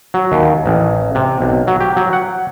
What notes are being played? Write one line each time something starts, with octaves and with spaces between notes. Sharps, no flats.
F#3
D#2
A1
C3
B1
F#3
G4
F#3
F#5